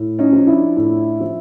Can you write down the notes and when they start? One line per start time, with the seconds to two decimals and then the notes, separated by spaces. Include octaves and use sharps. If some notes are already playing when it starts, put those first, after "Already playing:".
Already playing: A2
0.19 C#4 D#4
0.32 F3
0.47 D4 E4
0.77 A2
1.20 F3